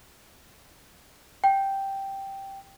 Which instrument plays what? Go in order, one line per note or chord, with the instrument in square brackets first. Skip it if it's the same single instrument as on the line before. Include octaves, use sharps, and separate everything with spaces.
[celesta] G5